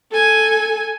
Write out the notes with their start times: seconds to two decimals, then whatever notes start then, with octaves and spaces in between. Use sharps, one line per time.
0.11 A4 G#5